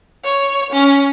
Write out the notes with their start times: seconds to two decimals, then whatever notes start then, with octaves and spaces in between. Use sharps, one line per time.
0.25 C#5
0.72 C#4